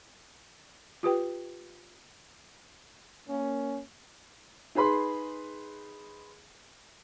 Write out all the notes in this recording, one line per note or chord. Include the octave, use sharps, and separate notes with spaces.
F4 G4 B4 G5
A#3 C#4
D#4 G#4 B4 B5 C6